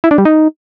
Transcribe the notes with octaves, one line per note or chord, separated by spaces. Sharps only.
E4
D4
G3
D#4